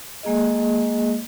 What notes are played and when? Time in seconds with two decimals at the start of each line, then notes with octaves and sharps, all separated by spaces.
0.23 G#3 A#3 G#4 D#5